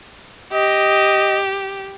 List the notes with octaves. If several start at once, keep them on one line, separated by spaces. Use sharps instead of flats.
G4 D#5